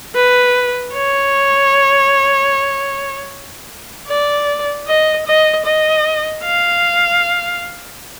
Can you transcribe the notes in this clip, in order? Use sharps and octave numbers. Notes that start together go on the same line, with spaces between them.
B4
C#5
D5
D#5
D#5
D#5
F5